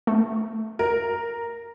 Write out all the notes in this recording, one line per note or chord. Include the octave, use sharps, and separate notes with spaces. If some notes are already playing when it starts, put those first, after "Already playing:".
A3
A#4